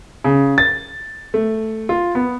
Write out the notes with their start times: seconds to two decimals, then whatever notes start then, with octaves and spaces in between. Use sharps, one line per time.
0.24 C#3
0.58 A6
1.34 A3
1.89 F4
2.15 B3